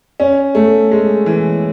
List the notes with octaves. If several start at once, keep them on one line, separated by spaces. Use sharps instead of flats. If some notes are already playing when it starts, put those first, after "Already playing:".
C#4
A3
G#3
E3